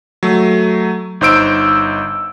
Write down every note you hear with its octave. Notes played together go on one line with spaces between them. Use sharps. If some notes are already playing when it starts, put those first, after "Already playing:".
F#3 A3
G1 D#4 C5 E6 D7